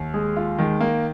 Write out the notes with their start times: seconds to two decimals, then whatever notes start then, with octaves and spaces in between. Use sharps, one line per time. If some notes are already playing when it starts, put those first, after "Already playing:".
Already playing: D#2
0.14 G#3 G#4
0.37 F4
0.58 D#3 G#3
0.80 A#3